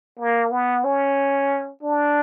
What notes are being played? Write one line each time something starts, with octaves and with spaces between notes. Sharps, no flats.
A#3
B3
C#4
D4